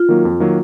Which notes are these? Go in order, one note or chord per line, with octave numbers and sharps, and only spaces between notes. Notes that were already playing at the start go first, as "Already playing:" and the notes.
Already playing: F4
D#3 F#3 A#3
F2
D#3 F#3 A#3